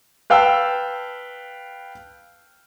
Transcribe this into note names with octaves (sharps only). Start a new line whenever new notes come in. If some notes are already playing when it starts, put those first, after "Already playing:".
B4 F5 G5 A5 E6